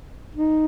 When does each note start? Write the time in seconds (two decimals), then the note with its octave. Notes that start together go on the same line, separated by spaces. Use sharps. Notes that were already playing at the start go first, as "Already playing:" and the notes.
0.35 D#4